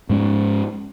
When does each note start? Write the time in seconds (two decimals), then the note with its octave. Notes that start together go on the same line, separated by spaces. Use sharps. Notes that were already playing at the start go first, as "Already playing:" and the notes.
0.09 G#2 G#3 C#4